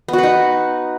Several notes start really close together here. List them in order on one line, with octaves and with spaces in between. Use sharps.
B3 F#4 B4 D#4